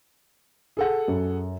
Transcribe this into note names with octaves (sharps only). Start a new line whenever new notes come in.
G#4 A4 F#5
F#2